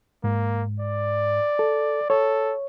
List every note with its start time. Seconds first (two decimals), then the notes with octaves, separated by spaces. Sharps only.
0.24 G#2 A#3
0.80 D5
1.59 A4
2.10 A4 C#5